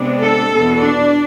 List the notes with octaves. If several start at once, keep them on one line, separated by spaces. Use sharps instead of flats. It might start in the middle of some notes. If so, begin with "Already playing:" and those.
Already playing: C3 G#3 B3 D4
A4
E2 B2 B3
D4